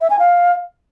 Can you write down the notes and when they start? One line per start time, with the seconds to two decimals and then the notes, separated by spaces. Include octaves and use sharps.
0.01 E5
0.10 G#5
0.19 F5